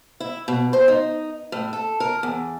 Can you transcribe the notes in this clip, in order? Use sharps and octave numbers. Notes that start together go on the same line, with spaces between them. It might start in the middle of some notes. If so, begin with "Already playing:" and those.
E4
B2
C5
D#4
A2
A4
A#4
E2